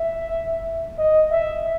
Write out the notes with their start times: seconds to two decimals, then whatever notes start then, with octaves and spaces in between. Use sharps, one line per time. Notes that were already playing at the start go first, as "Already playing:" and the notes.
Already playing: E5
0.98 D#5
1.31 E5